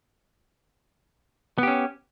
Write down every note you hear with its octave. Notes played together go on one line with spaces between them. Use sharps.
B3 C#4 G4